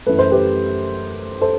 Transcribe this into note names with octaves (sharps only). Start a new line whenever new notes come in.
F#2 E3 A3 B4
C5
G4 B4
A4 C5